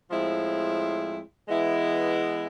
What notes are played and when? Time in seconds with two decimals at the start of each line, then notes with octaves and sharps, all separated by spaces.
0.11 A2 F3 G#3 C4 E4
1.48 E3 G#3 B3 E4